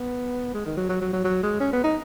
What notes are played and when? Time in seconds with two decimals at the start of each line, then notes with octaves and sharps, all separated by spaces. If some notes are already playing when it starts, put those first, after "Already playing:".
Already playing: B3
0.54 G#3
0.66 D#3
0.77 F#3
0.89 F#3
1.01 F#3
1.13 F#3
1.24 F#3
1.43 G#3
1.60 C#4
1.73 B3
1.84 D#4